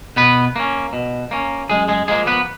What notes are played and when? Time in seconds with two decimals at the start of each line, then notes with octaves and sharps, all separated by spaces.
0.16 B2 B3 B4
0.56 A#3 C#4
0.93 B2
1.31 A#3 C#4
1.69 F#2 G#3 G#4
1.88 G#3 G#4
2.08 F3 G#3 A#3 G#4
2.27 B3 B4